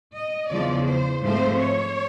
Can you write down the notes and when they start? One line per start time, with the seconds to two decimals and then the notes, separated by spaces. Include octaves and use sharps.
0.14 D#5
0.49 E2 C#3 F3 D5
0.85 C5
1.22 G#2 F3 A3 C4 C5
1.58 C#5